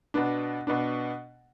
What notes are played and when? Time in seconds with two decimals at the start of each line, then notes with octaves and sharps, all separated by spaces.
0.14 B2 B3 D4
0.67 B2 B3 D4